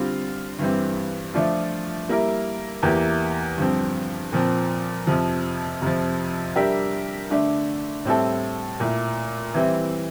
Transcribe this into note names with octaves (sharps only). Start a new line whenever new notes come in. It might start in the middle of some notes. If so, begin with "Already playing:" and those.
Already playing: D3 G3 C4 F4
G2 E3 G3 C4
F3 A3 D4 F4
G3 A#3 E4 A#4
E2 E3 A#3 E4 G4
G2 D3 F3 C4
A#2 F3 C4
F2 C3 F3
F2 C3 F3
G3 D4 G4 A#4 E5
D3 A3 D4
A2 G3 C4 E4 A4
A#2 A3 E4
E3 G3 C4 E4